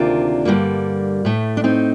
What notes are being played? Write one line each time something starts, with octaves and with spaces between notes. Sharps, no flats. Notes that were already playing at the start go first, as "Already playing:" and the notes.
Already playing: D2 C3 D#3 A#3 D4 F4
G2 D3 G3 A#3
A2 A3
D4
C4 D#4